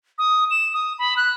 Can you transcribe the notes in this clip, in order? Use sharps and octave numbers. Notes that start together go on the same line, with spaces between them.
D#6
E7
D#6
B5
F#6